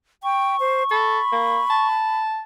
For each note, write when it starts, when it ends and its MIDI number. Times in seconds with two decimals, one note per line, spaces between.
0.23 0.56 79
0.23 1.87 85
0.60 0.83 72
0.91 1.20 69
0.91 2.22 83
1.32 1.59 58
1.70 2.39 81